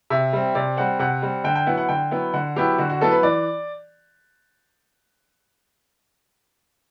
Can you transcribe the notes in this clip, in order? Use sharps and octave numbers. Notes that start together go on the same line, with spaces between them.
C3 E5
G3 C4
C3 D5
G3 C4 F#5
C3 F#5
G3 C4
D3 G5
G5
F#3 B3 E4 F#5
F#5
D3 G5
F#3 B3 E4
D3 F#5
F#3 B3 E4 G4
D3 F#4
F#4
F#3 B3 E4 A4
B4
E3 D5